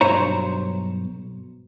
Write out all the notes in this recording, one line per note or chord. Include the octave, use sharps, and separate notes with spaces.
B1 G2 C5 C#5 A#5